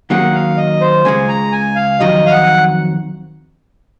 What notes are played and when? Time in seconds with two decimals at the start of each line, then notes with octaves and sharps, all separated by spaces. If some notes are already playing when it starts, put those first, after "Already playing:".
0.10 D#3 F#3 A#3 C#4 G#4 F#5
0.34 F5
0.57 D#5
0.81 C5
1.05 C#2 C#3 G#3 G#5
1.28 A#5
1.52 G#5
1.76 F5
2.00 F2 D#3 F#3 D#5
2.26 F5
2.31 F#5